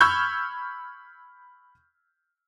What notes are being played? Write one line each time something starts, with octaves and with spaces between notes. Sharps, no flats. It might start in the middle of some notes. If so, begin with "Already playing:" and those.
B5 C#6 E6 F6 G6 G#6